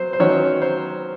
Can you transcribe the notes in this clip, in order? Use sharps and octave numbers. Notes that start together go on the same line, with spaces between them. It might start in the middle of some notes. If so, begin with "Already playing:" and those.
Already playing: F#3 C5
C5
D#3 F#3 C#4 C#5
C5